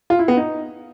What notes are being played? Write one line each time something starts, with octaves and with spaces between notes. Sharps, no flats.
F4
E4
B3
D#4